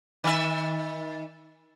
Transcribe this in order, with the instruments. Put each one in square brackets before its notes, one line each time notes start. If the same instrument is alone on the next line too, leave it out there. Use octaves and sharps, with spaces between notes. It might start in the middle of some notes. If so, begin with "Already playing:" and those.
[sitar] D#3 E5